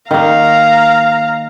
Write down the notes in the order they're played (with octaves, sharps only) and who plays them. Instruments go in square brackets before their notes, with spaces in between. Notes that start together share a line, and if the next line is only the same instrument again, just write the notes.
[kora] D#3 A#3 [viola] F5 A#5